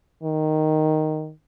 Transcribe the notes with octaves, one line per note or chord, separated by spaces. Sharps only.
D#3